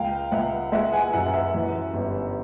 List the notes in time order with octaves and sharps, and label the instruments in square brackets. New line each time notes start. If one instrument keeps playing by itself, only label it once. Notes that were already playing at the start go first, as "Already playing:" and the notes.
Already playing: [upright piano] C#2 F5 G5
C#2 E5 F#5
G#3 E5 F#5
F#5 G#5
F#2 F#5 G#5
E5 F#5
E3
G1